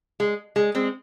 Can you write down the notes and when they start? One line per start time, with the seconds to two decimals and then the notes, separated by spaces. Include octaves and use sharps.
0.20 G#3
0.56 G#3
0.75 G#3 C4